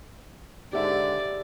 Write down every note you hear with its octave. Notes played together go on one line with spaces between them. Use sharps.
G#2 D3 G4 D5 E5